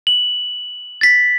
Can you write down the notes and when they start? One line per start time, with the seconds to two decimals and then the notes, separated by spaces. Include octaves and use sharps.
0.07 F#7
1.01 A6 B6